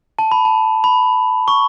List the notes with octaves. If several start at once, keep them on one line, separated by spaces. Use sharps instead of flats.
A5
B5
A5
B5
C#6